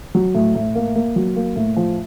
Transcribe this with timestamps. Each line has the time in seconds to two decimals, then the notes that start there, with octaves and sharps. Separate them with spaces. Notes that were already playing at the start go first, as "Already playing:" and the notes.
0.15 F#3
0.35 A2
0.55 A2
0.75 A#3
0.96 A#3
1.16 F#3
1.36 A#3
1.56 A2
1.76 F3